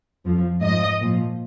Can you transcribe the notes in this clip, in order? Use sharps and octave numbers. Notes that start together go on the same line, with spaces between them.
F2 F3
G#2 F3 D#5
A#2 F3